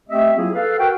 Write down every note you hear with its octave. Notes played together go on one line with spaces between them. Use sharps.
A3 C4 G4 D#5 E5
F#3 A#3 E4 F4 G#4
A4 B4 F5
F#4 A#4 B4 F#5 G5